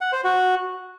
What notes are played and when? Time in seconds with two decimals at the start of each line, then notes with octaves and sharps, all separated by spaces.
0.01 F#5
0.13 C5
0.24 F#4